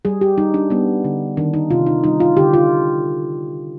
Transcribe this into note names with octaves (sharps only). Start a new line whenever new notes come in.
G3 G#4
G4
G3 D#4
D4
G3 B3
D3
D#3 D4
D#4
C3 F4
D#4
G3 D#4
F4
D3 G4
F4